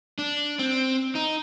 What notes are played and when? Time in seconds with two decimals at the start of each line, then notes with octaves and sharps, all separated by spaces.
0.19 D4
0.59 C4
1.15 D#4